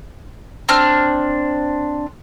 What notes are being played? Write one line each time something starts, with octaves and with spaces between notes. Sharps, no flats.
C4 D4 F6